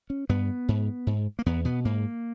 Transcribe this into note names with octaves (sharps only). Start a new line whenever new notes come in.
C#4
G2 B3
G#2
G#2
A#3
E2 B3
B2 B3
G#2 A#3